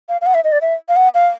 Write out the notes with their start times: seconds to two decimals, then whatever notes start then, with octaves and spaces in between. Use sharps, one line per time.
0.09 F5
0.21 F5
0.26 F#5
0.34 E5
0.44 D#5
0.52 D5
0.62 E5
0.89 F5
0.96 F#5
1.14 F5